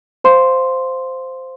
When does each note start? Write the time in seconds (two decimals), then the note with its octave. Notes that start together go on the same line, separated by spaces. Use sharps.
0.24 C5 F5 C6